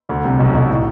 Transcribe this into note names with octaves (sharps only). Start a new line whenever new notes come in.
D2 D3
C2 C3
B1 B2
B1 B2
A2